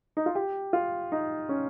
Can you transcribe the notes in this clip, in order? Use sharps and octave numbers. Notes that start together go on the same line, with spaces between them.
D#4
F4
G4
F4
D#4
C#4